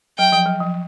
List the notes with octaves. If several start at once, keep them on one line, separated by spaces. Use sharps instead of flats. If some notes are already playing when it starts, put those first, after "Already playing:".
F#3 G5
F3
F#3
F3